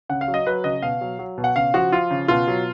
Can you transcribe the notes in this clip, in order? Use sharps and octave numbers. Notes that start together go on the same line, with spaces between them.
C#3 F#5
F5
F#3
D#5
F#3 B4
C#3 D#5
B2 F5
F#3
F#3
B2
F#5
C#3 F5
F3 F#4
F3 F4
C#3
B2 F4
F#3